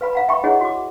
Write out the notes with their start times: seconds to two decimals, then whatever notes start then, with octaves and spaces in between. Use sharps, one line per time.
0.01 B4 F5 B5
0.13 F5 F#5 A#5
0.28 E5 G5 B5 C#6
0.44 E4 G#4 C#5 D#5 F#5
0.61 F#4 D6